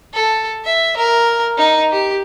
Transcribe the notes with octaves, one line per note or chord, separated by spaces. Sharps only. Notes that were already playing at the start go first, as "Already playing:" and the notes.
A4
E5
A#4
D#4
G4